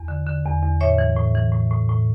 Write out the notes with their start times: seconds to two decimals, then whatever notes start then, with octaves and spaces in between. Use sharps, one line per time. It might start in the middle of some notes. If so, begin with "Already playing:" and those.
Already playing: E2
0.08 D3
0.26 D3
0.45 E2
0.62 E2
0.81 A2 C#5 E5
0.98 E3
1.17 A2
1.35 E3
1.53 A2
1.71 A2
1.89 A2